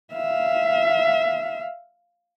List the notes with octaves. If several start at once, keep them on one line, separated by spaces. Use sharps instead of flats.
E5 F5